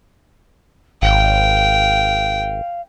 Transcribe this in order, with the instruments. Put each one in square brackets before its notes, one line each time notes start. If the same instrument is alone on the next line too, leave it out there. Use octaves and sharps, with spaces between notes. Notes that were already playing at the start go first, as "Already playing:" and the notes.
[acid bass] G#1 [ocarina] F5 [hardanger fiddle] G5